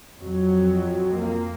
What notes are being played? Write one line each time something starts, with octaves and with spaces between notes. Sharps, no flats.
F2 F#3
A#3